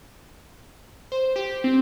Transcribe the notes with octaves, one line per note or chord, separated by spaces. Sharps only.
C5
G4
C4